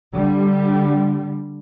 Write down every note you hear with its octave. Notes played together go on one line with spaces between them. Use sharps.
D3 G3